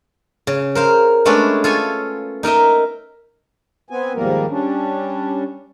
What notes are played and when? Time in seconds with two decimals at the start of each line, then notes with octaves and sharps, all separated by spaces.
0.47 C#3
0.75 A#4 C5 F5
1.25 G#3 A3 B3 C#4 D4 A4
1.64 F4 A4 C#5 G#5
2.43 D#4 A#4 D#5 E5
3.90 B3 C4 G#5
4.15 D#2 G#2 F3 G3 A#3 A#4
4.50 G3 C#4 D4